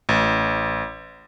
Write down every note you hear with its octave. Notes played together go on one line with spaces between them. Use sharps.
A1